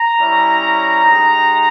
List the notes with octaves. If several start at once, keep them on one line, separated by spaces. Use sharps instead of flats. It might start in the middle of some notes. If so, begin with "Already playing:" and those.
Already playing: A#5
G3 C#4 E4
G#3 D#4 G4